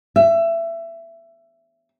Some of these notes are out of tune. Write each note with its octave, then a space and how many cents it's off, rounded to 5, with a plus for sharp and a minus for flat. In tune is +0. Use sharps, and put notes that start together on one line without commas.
E5 +20